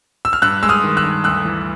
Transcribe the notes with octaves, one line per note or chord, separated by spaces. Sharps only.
E6
F6
G2 E6 F#6
G#3 E6
D#6 F6
D#3
E6 F#6
G2
D2 E6 F#6
E3